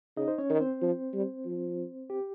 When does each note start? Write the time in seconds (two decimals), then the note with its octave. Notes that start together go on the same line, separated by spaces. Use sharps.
0.17 C#3 D#4 D#5
0.28 C5
0.38 C#4 C#5
0.49 D#3
0.60 C4 C5
0.81 F3
1.14 G3
1.46 F3
2.10 G4